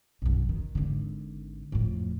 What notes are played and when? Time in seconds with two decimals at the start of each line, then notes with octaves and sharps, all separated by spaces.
0.22 B1 F#2
0.49 D#3
0.75 G#1 D3
1.72 F2 A2